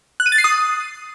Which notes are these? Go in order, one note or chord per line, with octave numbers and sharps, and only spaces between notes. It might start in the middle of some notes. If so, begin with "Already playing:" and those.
F#6
D#7
A6
C7
D#6